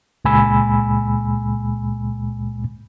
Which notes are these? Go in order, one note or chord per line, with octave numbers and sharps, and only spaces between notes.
C#2 A#2 G#3 G#5 B5 E6